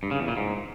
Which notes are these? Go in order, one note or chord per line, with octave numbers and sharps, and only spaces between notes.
G2
C#3
E2
A#2
G#2